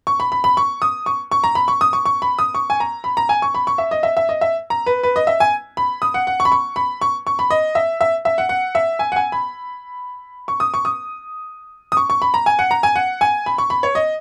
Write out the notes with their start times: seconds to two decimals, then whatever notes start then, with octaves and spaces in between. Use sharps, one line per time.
0.07 C#6
0.20 B5
0.32 B5
0.44 B5
0.57 C#6
0.82 D#6
1.06 C#6
1.32 C#6
1.44 A#5
1.55 B5
1.68 C#6
1.81 D#6
1.93 C#6
2.06 C#6
2.22 B5
2.39 D#6
2.55 C#6
2.70 G#5
2.80 A#5
3.04 B5
3.17 A#5
3.29 G#5
3.42 C#6
3.55 B5
3.67 C#6
3.78 E5
3.91 D#5
4.03 E5
4.17 E5
4.29 D#5
4.41 E5
4.70 A#5
4.86 B4
5.03 B4
5.16 D#5
5.27 E5
5.40 G#5
5.77 B5
6.02 D#6
6.14 F#5
6.27 F#5
6.40 C#6
6.45 B5
6.52 C#6
6.76 B5
7.01 C#6
7.27 C#6
7.39 B5
7.50 D#5
7.75 E5
8.01 E5
8.25 E5
8.38 F#5
8.49 F#5
8.75 E5
8.99 G#5
9.12 F#5
9.16 G#5
9.32 B5
10.48 C#6
10.60 D#6
10.74 C#6
10.85 D#6
11.92 D#6
11.97 C#6
12.10 C#6
12.22 B5
12.34 A#5
12.46 G#5
12.59 F#5
12.71 A#5
12.83 G#5
12.96 F#5
13.21 G#5
13.46 B5
13.58 C#6
13.70 B5
13.83 C#5
13.95 D#5